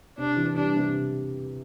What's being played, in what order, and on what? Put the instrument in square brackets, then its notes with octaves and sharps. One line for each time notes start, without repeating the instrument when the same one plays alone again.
[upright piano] C3 [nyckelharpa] D4
[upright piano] E3
[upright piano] G3 [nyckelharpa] D4
[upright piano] C3